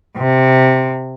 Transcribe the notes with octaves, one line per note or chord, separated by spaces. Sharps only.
C3